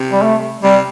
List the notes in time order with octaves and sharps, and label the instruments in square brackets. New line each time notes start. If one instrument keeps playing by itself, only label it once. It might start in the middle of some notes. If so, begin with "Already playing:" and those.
Already playing: [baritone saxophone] C3
[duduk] G3
A3
[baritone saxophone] C3 [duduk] G3